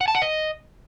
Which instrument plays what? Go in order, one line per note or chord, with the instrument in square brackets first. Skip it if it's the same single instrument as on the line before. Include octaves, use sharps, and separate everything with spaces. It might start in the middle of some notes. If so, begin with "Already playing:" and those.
[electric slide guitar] F#5
A5
F#5
D#5